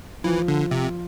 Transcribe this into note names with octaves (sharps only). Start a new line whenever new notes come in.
E3 F3
D3
C3